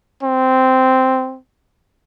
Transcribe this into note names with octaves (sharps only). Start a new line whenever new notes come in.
C4